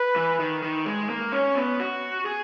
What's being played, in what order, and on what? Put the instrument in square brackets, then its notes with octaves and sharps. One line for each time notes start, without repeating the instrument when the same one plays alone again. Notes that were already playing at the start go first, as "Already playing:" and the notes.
Already playing: [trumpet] B4
[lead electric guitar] E3
D#3
D#3
G#3
A#3
C#4
B3
F#4
G#4